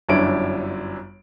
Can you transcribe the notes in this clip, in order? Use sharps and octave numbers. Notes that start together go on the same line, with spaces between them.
G1 F#2 D4 E4 C#5 D7